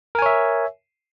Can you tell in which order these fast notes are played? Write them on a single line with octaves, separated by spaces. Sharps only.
A#4 G#5 C#5 E5